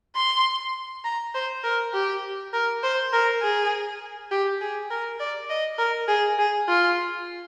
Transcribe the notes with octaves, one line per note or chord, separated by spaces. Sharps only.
C6
A#5
C5
A#4
G4
A#4
C5
A#4
G#4
G4
G#4
A#4
D5
D#5
A#4
G#4
G#4
F4